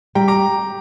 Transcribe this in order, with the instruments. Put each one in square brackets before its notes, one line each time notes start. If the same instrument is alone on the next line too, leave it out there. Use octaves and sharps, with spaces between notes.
[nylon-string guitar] G3 [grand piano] G5 A#5
[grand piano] A#5 D6